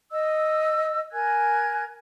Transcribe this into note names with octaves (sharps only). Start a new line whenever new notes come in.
D#5 E6
A#4 G#5 F#6 G#6